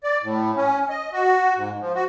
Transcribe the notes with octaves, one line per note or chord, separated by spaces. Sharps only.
D5
A2
C#4
D#5
F#4
G#2
F3
F#4